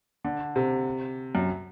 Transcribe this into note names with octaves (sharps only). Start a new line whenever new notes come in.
D3
C3
F#2